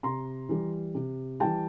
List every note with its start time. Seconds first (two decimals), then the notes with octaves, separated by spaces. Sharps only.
0.03 C3 A#5 C6
0.49 E3 G3
0.95 C3
1.40 E3 G3 G5 A5